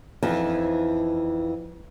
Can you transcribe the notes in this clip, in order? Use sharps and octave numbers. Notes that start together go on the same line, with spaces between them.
F2 E3 D#4